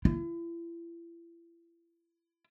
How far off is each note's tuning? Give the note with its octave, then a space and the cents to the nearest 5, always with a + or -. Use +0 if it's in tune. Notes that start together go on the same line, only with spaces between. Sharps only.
E4 +35